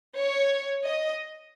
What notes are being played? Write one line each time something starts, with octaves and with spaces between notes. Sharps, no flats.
C#5
D#5